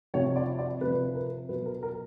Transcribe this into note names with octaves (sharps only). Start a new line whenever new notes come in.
C3 F3 C#5
D5
D5
C3 F3 B4
B4
A#4
B2 F#3 B4
A#4
A#4